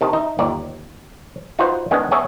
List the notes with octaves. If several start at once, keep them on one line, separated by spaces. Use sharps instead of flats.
C3 D#3 A5
D#4 E5
G1 D#2 D5 A#5
D#4 F4 F#4 B4 C5
D#3 G#3 B3 C#4 D4
B3 G#4 C#5 E5